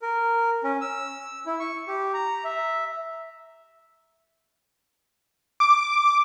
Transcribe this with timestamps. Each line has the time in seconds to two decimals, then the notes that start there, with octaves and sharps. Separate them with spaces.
0.02 A#4
0.64 C#4
0.81 E6
1.46 E4
1.60 C#6
1.88 G4
2.14 A#5
2.45 E5
5.60 D6